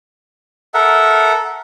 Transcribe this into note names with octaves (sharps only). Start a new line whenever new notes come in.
A4 A#4 E5 F#5